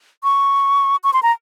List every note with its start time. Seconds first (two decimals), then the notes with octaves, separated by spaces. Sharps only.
0.24 C#6
1.04 C#6
1.13 C6
1.23 A#5